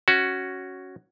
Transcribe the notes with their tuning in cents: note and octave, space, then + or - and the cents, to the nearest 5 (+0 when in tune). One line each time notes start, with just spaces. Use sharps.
C#4 +0 F#4 +5